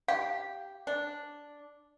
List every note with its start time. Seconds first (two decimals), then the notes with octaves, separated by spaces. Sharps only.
0.08 G4 F5
0.87 D4